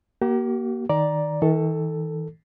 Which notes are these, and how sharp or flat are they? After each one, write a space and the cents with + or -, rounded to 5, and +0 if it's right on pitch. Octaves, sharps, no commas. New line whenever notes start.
A#3 +15 G4 -45
D#3 +0 D5 +0 A#5 +10
D#3 +45 A4 +5